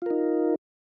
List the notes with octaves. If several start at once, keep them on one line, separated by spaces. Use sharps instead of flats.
D#4 F4 A#4